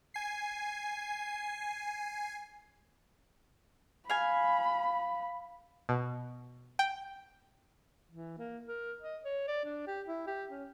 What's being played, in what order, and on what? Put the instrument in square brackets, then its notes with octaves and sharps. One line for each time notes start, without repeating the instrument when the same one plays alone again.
[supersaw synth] G#5 C7
[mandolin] F5 G#5 [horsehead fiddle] B5
[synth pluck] B2
G5
[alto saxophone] E3
A#3
A#4
D#5
C#5
D5
D4
G4
E4
G4
C#4